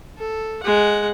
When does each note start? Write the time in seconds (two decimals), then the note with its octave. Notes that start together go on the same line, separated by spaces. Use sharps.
0.18 A4
0.63 G#3 F#5